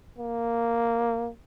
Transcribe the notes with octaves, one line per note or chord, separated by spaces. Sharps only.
A#3